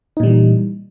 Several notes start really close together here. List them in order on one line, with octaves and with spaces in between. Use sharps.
D#4 A#2 G3 E3